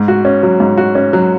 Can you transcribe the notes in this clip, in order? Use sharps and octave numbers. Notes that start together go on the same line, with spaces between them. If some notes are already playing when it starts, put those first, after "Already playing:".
Already playing: G#2
F#4
C#4
F#3
G#2
F#4
C#4
F#3